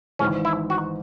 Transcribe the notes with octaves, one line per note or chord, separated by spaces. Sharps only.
G#1 G#2 E3 C#4
E4
F#4